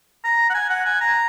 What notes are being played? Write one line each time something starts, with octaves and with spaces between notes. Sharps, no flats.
A#5
F#5
G#5
F#5
G#5
A#5